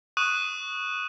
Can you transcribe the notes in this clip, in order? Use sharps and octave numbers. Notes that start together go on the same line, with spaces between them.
C#6 D#6 F#6 D#7